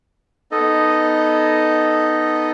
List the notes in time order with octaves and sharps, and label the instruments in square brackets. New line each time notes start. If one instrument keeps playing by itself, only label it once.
[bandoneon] B3 D#4 A4 D#5